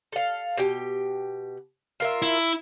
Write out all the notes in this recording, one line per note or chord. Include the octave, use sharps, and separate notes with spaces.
A4 F5
B2 G4 G5
F4 A#4 E5
E4